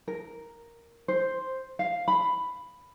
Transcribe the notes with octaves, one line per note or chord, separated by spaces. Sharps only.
A#4
C5
F5
B5